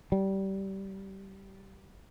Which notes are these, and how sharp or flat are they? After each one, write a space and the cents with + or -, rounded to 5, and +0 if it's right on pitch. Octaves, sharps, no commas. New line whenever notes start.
G3 -20